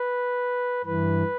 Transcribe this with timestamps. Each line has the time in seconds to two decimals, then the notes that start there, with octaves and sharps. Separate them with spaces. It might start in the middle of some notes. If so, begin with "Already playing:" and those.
Already playing: B4
0.85 G2 E3 B4